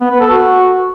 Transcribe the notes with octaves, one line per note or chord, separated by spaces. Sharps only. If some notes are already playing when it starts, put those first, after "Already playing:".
B3
B4
A4
F#4